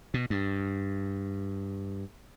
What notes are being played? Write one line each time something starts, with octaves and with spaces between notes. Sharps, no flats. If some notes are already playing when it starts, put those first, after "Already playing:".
B2
G2